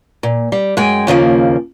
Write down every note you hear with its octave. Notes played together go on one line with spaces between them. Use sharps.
A#2
G3
F#2 G#3 G5 G#5
D#2 C#3 F3 A#3